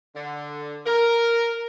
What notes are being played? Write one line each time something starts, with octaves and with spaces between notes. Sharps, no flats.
D3
A#4